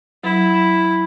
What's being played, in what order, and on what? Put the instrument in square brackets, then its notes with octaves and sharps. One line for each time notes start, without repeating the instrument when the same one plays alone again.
[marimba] F#3 [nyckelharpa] E4